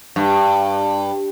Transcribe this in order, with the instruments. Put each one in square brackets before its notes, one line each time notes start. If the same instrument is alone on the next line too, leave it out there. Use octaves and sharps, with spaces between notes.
[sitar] G2